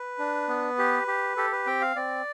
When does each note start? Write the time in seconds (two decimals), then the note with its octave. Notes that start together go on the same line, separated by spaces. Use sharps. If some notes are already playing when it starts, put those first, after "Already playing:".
Already playing: B4
0.19 D4
0.48 B3
0.78 G4
1.07 G4
1.37 G4 A4
1.52 B4
1.66 C4 G5
1.82 F5
1.96 C4 D5